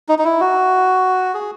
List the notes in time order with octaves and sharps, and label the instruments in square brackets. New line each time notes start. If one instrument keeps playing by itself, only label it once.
[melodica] D#4
D#4
E4
F#4
G#4